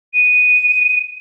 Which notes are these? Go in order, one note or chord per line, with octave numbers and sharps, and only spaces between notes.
D#7